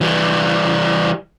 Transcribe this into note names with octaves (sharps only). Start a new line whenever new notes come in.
E3 G3